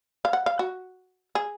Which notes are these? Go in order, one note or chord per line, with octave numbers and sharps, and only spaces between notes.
F5
F#5
F5
F#4
G#4